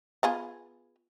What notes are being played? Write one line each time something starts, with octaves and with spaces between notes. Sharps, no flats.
B3 F4 G#4